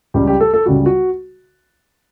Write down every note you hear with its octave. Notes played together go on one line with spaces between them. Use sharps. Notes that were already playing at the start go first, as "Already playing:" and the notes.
C#2 C#3 G3 G4
G4
A4
A4
C#2 C#3 G3 F#4
F#4